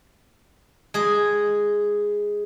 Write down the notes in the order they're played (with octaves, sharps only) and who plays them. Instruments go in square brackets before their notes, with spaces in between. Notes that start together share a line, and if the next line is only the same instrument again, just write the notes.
[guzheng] G#3 G#4